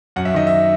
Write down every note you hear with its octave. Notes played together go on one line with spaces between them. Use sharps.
F#2 F#5
E5
D#3 D#5
E5